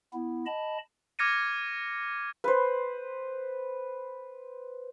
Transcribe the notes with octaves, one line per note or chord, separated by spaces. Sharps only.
B3 E4
D#5 A5 B5
D6 F6 G#6 A#6 C#7 D#7
B4 C5